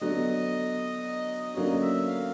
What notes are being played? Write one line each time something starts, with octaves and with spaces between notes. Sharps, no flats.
D3 F#3 B3 D#5
D3 F#3 A#3 C#4 D#5
E5
F5